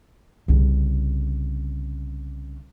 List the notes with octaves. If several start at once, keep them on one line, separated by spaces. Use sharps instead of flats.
C2 C#3